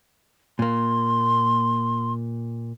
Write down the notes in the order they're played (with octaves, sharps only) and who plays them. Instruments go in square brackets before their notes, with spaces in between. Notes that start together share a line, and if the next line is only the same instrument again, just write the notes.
[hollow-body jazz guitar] A#2 A#3 [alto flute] C6